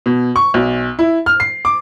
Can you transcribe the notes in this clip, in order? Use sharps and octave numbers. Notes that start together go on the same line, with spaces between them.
B2
C#6
B1
E4
F6
C7
D6